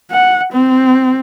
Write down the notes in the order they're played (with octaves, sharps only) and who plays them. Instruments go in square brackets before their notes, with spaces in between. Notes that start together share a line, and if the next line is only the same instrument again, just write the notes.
[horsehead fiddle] F#5
C4